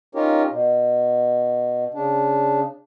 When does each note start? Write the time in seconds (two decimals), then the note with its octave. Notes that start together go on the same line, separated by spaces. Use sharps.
0.15 C#4 D#4 F4 G4 A#4 C#5
0.51 B2
1.94 C#3 D4